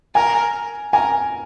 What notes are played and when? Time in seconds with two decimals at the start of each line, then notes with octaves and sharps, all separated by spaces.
0.14 A#4 G#5
0.93 A#4 G#5